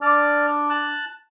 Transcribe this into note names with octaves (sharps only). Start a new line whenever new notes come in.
D4 D5 F6
A5 F#6